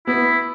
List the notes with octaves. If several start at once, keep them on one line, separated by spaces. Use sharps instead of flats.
B3 E4